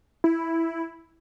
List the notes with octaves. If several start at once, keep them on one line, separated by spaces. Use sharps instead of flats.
E4